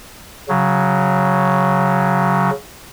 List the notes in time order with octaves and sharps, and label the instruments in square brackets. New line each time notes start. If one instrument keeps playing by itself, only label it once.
[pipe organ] C#3 F#3